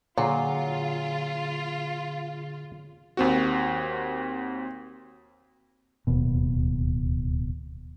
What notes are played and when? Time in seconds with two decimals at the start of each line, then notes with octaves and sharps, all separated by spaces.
0.18 A#2 D3 F#3 F4 G#4 C7
3.17 D#2 C4 F#4
6.07 D1 D#2 B2